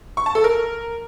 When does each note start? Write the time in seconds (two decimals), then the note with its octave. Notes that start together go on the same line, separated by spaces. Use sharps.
0.17 C#6
0.26 A5
0.35 A4
0.44 A#4